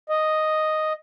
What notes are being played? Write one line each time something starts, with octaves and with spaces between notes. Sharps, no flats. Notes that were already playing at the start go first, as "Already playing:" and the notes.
D#5